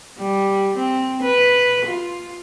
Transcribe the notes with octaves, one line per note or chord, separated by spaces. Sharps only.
G3
C4
B4
F4